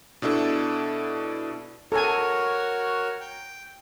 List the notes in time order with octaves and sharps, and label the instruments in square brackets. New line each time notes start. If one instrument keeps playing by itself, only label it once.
[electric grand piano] B2 D4 E4 A4
[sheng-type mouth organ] F#4 A#4 C#5 [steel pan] A4 G#5
[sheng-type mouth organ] G5